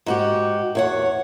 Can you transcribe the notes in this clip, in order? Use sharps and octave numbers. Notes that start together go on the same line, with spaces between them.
G#2 F#4 G4
E2 C#5 F#5